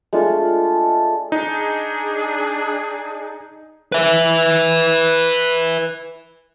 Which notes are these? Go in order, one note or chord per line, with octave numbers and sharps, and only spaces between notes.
G#3 A3 D4 F4
D4 D#4 G#4
B4 E5